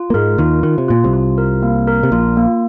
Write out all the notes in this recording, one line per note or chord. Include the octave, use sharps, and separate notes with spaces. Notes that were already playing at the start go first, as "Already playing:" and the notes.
Already playing: F4
A#3
G#2 G#3 A#4
D#2 D#3 F4
D#3 F4
C3
A#2 F4
C2 C3
F4
A#4
A#3
A#4
C3
A#1 A#2 F4
A#3